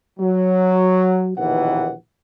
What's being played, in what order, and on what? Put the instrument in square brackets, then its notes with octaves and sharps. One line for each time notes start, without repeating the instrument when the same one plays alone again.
[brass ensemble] F#3
A#1 D#2 B2 D#3 E3 F#5